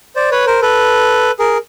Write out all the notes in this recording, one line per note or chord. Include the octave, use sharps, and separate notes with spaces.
C5 D5
B4 C#5
A#4 C5
A4 B4
G#4 A#4